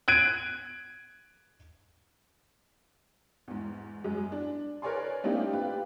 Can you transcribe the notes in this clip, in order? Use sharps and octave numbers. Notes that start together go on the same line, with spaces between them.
F#6 G#6 D7 D#7
E2 G#2
F#2 G#3
D4
A#4 B4 C#5 D5 G#5 C6
A3 A#3 C4 D4 D#4 G4
F4 G4 B4